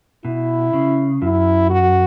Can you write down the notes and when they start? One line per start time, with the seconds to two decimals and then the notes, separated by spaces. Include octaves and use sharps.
0.25 B2 E4
0.73 C#3
1.22 F#2 E4
1.70 F#4